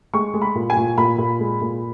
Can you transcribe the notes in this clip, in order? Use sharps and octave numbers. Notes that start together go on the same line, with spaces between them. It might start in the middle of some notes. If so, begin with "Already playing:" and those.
G#3 C#6
G#3
B5
A#2
G#5
A#2
A#2 B5
A#2
G#3
A#2